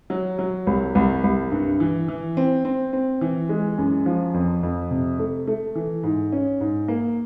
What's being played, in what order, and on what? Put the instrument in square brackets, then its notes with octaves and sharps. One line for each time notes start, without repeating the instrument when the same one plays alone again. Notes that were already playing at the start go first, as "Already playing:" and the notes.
[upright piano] F#3
F#3
C2
C2
C2
G2
E3
E3
C4
C4
C4
E3
G#3
F#2
F3
F2
F2
C3
A3
A3
E3
G#2
C#4
G#2
A#3